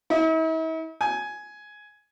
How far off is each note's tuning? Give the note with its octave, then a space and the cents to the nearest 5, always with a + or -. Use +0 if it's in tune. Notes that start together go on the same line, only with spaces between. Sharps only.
E4 -45
G#5 +10